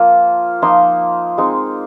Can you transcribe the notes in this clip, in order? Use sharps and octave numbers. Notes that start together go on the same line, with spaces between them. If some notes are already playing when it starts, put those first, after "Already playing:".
Already playing: F3 A#3 F4
F3 A#3 D#4 C6
G#3 C4 D#4